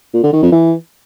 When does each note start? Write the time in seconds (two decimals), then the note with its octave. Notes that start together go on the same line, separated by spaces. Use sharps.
0.14 A#2
0.23 D3
0.33 D#3
0.43 F2
0.52 E3